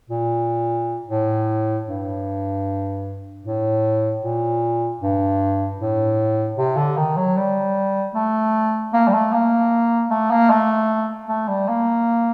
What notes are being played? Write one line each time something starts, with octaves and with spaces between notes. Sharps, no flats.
A#2
A2
G2
A2
A#2
G2
A2
C3
D3
D#3
F#3
G3
A3
A#3
G3
A3
A#3
A3
A#3
A3
A3
G3
A#3